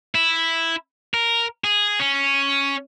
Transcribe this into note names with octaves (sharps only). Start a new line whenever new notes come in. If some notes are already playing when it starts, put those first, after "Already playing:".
E4
A#4
G#4
C#4